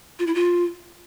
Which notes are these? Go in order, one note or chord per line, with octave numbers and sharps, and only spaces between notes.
F4
E4
F4